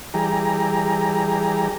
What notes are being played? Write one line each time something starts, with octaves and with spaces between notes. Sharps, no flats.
E3 G3 G4 G#4 A#5